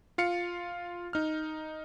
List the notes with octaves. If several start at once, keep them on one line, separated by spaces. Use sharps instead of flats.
F4 F5 C#7
D#4 F6